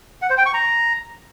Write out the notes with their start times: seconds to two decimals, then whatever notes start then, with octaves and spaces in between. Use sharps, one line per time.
0.22 F#5
0.30 C5
0.38 G5
0.46 C#6
0.54 A#5